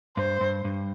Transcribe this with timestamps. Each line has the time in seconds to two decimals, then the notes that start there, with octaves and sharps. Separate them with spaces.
0.17 G2 C5
0.41 G2
0.64 G2